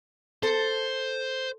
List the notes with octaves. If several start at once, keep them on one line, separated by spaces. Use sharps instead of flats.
A4 C5